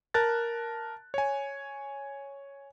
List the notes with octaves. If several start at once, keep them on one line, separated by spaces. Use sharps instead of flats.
A#4 A5 F#6 A6
C#5 G#5